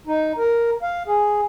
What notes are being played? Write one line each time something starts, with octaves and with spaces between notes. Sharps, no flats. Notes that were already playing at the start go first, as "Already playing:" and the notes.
D#4
A#4
F5
G#4